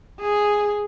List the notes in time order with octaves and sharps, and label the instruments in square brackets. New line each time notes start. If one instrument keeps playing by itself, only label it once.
[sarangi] G#4